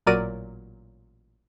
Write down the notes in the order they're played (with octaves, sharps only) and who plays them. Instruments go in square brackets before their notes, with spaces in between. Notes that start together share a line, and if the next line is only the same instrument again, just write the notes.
[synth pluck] A1 A#2 F#3 A#4 D5 D#7